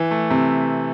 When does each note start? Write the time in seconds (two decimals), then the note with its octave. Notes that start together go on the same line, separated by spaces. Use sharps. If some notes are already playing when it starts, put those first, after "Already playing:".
Already playing: E3
0.11 A3
0.30 C3